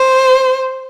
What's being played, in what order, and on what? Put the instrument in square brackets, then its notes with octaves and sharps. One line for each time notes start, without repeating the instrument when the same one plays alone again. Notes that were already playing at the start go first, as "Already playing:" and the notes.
Already playing: [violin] C5